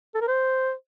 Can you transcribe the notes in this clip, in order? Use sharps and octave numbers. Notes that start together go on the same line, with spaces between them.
A4
A#4
C5